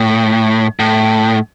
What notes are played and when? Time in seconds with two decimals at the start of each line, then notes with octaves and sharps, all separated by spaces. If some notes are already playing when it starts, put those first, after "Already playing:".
Already playing: A2
0.79 A2